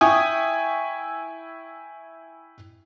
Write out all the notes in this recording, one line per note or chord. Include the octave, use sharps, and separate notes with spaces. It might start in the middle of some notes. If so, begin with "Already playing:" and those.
E4 E5 G5 G#5 C#6 D#6